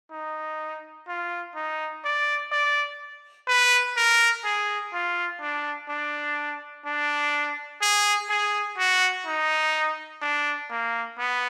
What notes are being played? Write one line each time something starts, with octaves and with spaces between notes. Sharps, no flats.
D#4
F4
D#4
D5
D5
B4
A#4
G#4
F4
D4
D4
D4
G#4
G#4
F#4
D#4
D4
A#3
B3